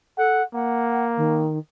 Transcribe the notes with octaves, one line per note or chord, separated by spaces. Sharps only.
A4 F#5
A#3 F#5
D#3